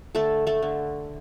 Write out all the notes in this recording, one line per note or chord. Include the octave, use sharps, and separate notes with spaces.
D3 A3 A4
A3 A4
D3